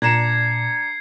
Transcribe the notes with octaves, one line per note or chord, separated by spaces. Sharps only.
A#2 D4 A#5 G#6 C7 C#7 E7